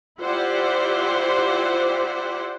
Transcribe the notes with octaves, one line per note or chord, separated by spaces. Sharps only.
E4 F4 G4 C5 D5 F#5